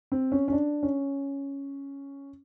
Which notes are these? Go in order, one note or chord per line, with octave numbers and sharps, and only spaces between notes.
C4
C#4
C#4
D4
C#4